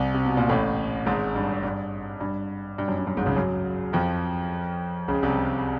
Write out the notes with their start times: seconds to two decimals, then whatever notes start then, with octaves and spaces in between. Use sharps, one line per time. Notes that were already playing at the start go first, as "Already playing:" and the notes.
Already playing: C2 C3
0.14 C3
0.25 B2
0.37 A#2
0.49 A1 A2
1.06 G#1 G#2
1.35 G2
1.63 G2
2.21 G2
2.78 G2
2.88 F#2
2.98 G2
3.07 F#2
3.16 G#1 G#2
3.26 C#2 C#3
3.35 F#2 F#3
3.93 F2 F3
5.08 C#2 C#3
5.23 C2 C3